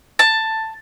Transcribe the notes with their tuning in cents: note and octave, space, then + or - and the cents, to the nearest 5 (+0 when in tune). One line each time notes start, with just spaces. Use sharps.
A5 +10